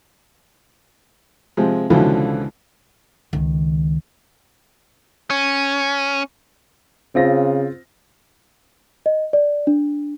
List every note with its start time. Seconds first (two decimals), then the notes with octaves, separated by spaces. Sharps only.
1.57 C3 F3 G#3
1.90 C#2 B2 D3 E3 F3 B3
3.33 C#2 D#3
5.30 C#4
7.15 C#3 C4 F4 A#6
9.06 D#5
9.33 D5
9.67 D4